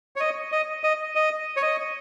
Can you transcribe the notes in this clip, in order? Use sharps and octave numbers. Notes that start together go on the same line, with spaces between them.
C#5
D#5
D#5
D#5
D#5
C#5
D#5